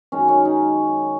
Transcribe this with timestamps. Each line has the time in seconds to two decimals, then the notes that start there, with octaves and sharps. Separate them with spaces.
0.12 F#2 D#3 G#3 C#4
0.28 C#4
0.45 D#4